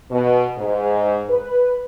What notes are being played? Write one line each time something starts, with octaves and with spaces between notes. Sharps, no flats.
B2
G#2
B4